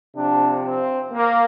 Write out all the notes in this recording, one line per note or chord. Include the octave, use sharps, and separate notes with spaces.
C3 F3 D4
C4
A#3